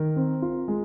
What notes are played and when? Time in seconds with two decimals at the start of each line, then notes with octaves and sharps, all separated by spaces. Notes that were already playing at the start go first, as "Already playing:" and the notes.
Already playing: D#3 A#4
0.16 C4
0.42 F4
0.68 G#3